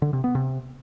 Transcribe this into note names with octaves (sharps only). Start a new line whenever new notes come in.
D3
C3
B3
C3